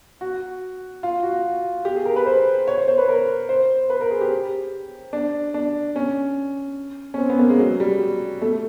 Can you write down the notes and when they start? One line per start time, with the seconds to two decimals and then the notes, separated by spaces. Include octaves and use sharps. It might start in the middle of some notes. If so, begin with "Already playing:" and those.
0.21 F#4
1.03 F4
1.23 F#4
1.85 G4
1.96 G#4
2.06 A#4
2.16 B4
2.26 C5
2.68 C#5
2.78 C5
2.88 C5
2.98 B4
3.09 A#4
3.49 C5
3.90 B4
4.01 A#4
4.11 G#4
4.21 G4
5.13 D4
5.54 D4
5.96 C#4
7.14 C#4
7.18 C4
7.29 B3
7.39 A#3
7.49 G#3
7.59 F#3
7.80 G3
8.41 A3